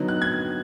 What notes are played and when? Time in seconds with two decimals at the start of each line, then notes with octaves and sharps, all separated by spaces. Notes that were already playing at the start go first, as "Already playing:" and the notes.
Already playing: D3 F#3 B3 D#4
0.08 F#6
0.22 G#6